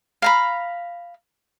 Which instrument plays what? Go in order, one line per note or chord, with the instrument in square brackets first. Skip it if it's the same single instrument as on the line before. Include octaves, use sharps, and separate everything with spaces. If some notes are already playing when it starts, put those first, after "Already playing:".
[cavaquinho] F5 A#5 B5